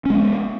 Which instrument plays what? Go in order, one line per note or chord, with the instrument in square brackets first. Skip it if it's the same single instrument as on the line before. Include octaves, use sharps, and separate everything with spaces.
[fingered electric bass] C#4
G#3
B3